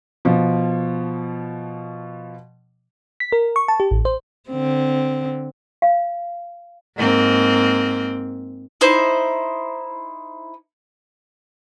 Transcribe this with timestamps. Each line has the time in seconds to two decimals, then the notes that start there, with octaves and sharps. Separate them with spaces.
0.25 B2 F3
3.20 B6
3.32 A#4
3.56 C#6
3.68 A5
3.80 G4
3.91 A1
4.05 C5
4.50 D3 C4
5.82 F5
6.97 G#2 A#3 C4
8.81 D#4 E4 C5